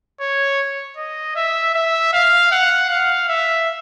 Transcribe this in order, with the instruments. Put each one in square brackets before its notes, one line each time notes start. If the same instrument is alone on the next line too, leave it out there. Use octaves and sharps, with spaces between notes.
[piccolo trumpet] C#5
D#5
E5
E5
F5
F#5
F5
E5